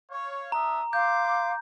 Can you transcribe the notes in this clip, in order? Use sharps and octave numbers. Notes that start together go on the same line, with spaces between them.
C#5 F5
D4 E5 A#5 D#6
F5 C6 D6 G6